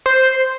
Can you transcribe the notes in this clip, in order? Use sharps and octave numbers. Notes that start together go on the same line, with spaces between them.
C5